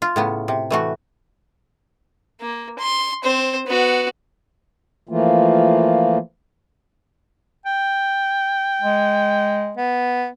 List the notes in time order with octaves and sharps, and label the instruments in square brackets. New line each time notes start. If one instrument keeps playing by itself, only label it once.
[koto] F4
A2 C#3 B3
C3
E3 A3 F#4
[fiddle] A#3
C6
C4 C5
B3 F#4
[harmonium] E3 F3 A3 A#3 F4
[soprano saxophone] G5
[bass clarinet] G#3
[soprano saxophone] B3